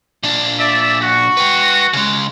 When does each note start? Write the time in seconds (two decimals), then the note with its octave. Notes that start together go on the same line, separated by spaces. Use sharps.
0.23 A#2 D4
0.60 D5 E5
1.02 F#4
1.37 B4 G5
1.93 C#3 G#3